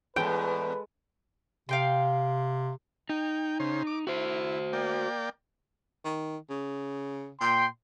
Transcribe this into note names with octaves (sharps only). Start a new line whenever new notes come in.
E2 A2 G#3 A4 B4 G5
C3 F5 G5 C6
D#4 G5
C#3 C5
D6
E4 F#4 C5
A#3 D5 G5
D#3
C#3
A#2 G5 C6